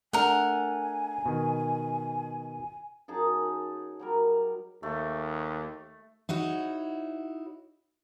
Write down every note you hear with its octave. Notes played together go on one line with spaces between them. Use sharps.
A3 D4 A#4 F#5 G#5
B2 D#3
F#2 D#4 G#4 A5
F#3 G3 A#4
D#2 A3
D#4 E4 F#4 C#5